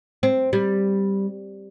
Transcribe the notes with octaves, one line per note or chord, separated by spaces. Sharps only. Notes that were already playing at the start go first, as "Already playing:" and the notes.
C4
G3